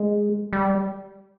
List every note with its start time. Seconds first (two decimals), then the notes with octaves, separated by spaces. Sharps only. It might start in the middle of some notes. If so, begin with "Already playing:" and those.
Already playing: G#3
0.53 G3